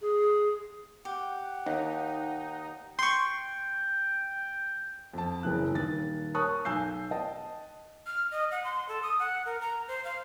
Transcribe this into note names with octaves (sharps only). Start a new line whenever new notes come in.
G#4
G4 F#5
D#2 D#4
G5 C6 C#6
F2 A5
F#1 E3 F#6
D#1 D#3 A6
A#4 C#5 A5 C#6 D#6 F#6
B1 G#5 E6 G6 C7
D#5 G5 A5
F6
D#5
F#5
C6
A4
D#6
F#5
A#4
A#5
C5
F5